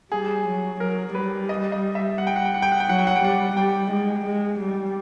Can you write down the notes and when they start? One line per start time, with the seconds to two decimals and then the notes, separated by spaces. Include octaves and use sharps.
0.11 G3 G#4
0.47 F#3
0.80 F#3 A#4
1.15 G3 B4
1.49 D#5
1.72 D#5
1.95 E5
2.18 F#5
2.27 G5
2.36 F#5
2.45 G5
2.54 F#5
2.62 G5
2.72 F#5
2.80 G5
2.88 F#3 F#5
2.98 G5
3.07 F#5
3.16 G5
3.22 G3 F#5
3.56 G3 G5
3.91 G#3
4.25 G#3
4.60 G3